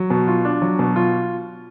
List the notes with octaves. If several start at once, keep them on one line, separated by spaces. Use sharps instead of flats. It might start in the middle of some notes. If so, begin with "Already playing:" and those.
Already playing: F#3
B2
F4
D4
F#3
B2
F4